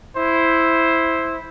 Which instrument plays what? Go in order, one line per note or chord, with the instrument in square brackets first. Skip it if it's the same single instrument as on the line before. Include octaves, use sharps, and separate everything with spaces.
[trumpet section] E4 C5